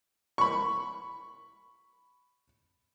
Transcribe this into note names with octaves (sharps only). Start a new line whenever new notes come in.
B5 C#6